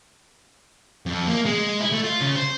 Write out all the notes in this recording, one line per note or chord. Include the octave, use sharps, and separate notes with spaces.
F2
A#3
G#3
E4
A3
F4
C#3
C5